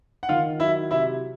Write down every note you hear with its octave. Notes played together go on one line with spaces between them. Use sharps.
F#5
D#3 F4 F5
F#3 E4 E5
C3 E4 E5